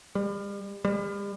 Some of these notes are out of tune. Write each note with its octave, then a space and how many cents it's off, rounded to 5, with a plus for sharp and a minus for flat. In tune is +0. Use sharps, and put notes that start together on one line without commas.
G3 +40
G3 +40